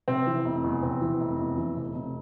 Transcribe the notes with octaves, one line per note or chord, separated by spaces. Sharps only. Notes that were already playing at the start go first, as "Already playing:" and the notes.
C3 C4
E3
F1
E2
C3 C4
E3
F1
E2
E3
F1
F1